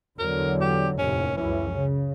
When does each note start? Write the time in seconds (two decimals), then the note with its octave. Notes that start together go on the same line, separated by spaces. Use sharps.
0.19 E2 D3 F#3 A#4
0.61 G4
0.99 F1 D#2 A2 C#4
1.37 C#2 F#2 E3 C#4
1.71 C#3